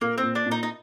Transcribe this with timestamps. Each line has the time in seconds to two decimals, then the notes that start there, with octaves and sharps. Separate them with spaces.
0.01 A#2 A#3
0.18 C4
0.23 A#2
0.35 D4
0.46 A#2
0.51 D#4
0.63 D#4